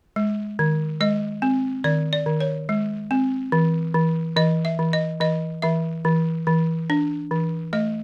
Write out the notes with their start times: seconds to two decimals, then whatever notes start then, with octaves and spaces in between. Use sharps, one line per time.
0.16 G#3
0.59 D#3
1.01 G#3 D#5
1.42 C4
1.84 D#3 D5
2.13 D5
2.26 D#3
2.40 C#5
2.69 G#3
3.11 C4
3.52 E3
3.94 E3
4.37 E3 D#5
4.65 E5
4.79 E3
4.93 D#5
5.20 E3 D#5
5.62 E3 E5
6.05 E3
6.47 E3
6.90 D4
7.31 E3
7.73 A3 D#5